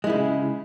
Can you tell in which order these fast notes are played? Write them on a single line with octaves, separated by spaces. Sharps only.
G#3 E4 C#3